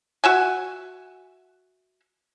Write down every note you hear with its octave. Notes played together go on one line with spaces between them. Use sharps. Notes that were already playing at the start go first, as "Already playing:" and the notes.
F#4 E5 G#5